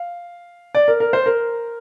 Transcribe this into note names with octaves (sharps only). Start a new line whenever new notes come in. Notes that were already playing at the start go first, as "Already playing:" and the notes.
Already playing: F5
D5
A#4
A#4
C5
A#4